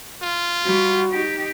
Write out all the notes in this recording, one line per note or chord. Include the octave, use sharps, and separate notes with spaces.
F4
G3 F#4
D#4 G4